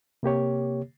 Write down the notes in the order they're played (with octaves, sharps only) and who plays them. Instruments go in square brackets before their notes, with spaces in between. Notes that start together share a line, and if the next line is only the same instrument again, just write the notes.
[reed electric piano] C3 A#3 G4 C#5